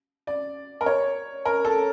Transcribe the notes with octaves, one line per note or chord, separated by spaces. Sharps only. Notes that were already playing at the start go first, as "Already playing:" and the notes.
D5
A#4
C#5
A#4
A4